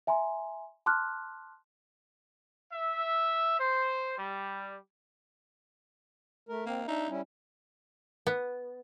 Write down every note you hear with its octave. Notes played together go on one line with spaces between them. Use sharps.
E5 G#5 A#5 C6
A5 C6 D6 F6 F#6
E5
C5
G3
A3 A#4
A#3 C4
D4 D#4 E5
G3 C#4 E4
B3